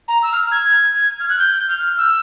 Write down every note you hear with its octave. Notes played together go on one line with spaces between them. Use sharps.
A#5
E6
F6
G#6
F6
F#6
G6
F6
E6